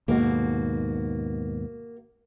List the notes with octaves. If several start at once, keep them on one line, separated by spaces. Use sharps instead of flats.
D#2 G#2 B2 A#3 F#4